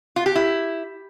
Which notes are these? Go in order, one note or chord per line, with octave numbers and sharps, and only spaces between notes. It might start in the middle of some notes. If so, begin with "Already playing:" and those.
F4
G4
E4